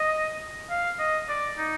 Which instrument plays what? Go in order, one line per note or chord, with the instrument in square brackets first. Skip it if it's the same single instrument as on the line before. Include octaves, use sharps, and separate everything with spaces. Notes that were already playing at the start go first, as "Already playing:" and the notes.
Already playing: [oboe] D#5
F5
D#5
D5
D#4